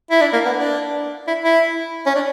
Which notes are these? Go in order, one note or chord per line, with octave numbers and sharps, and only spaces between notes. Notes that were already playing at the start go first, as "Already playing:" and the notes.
E4
D4
A#3
B3
D4
E4
E4
C#4
D4